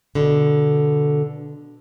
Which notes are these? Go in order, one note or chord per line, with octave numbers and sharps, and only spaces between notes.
B2 D3